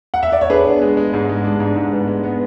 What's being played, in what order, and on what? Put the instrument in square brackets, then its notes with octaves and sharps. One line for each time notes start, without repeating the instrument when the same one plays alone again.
[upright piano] F#5
E5
D5
C#5
[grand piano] D4 [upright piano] G#4 B4
[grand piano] B3
G#3
G#3
G#2
G#3
D4
G#2
G#2
B3
G#3
B3